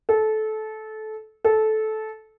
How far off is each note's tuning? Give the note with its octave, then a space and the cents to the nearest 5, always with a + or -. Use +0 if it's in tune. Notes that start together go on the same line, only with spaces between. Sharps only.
A4 -20
A4 -15